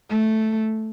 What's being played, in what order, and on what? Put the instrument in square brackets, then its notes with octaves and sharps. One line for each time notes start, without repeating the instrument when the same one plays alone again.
[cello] A3